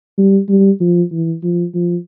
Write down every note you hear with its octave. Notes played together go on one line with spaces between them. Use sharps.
G3
G3
F3
E3
F3
F3